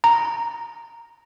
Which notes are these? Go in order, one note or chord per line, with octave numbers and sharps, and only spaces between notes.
A#5